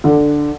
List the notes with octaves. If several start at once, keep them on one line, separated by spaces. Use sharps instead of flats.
D3